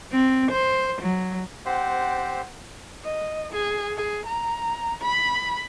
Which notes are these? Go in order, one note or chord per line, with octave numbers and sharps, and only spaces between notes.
C4
C5
F#3
C4 G4 C5 F#5
D#5
G#4
G#4
A#5
B5